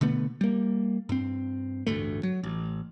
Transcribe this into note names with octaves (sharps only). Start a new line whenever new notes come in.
B2 D3 A3 B3
G3 A#3
G2 C4
A1 D2 G2 A3
F#3
A1